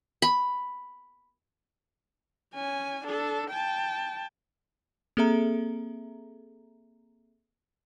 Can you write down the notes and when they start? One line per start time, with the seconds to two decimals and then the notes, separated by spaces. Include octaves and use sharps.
0.22 B5
2.55 C#4 G#5
3.05 D4 A4
3.50 G5 A5
5.17 A#3 C4 G#4 A4 E5 A#5